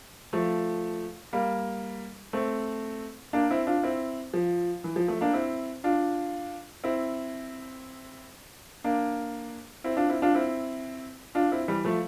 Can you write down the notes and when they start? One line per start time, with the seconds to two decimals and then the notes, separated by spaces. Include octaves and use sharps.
0.33 F3 A3
1.33 G3 A#3
2.33 A3 C4
3.33 A#3 D4
3.50 C4 E4
3.67 D4 F4
3.83 C4 E4
4.34 F3
4.84 E3
4.96 F3
5.08 F3 A3
5.21 A#3 D4
5.33 C4 E4
5.84 D4 F4
6.84 C4 E4
8.84 A#3 D4
9.84 C4 E4
9.97 D4 F4
10.09 C4 E4
10.22 D4 F4
10.35 C4 E4
11.35 D4 F4
11.52 C4 E4
11.68 E3 G3
11.85 F3 A3